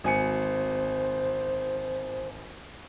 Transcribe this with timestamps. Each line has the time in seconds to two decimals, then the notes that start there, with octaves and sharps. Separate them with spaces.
0.04 G#1 C5 G#5 C#7